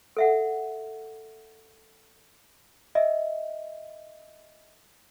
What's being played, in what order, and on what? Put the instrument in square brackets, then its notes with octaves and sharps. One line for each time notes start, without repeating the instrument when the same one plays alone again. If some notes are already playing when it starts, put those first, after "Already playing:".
[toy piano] A4 E5 F#5
[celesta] D#5 E5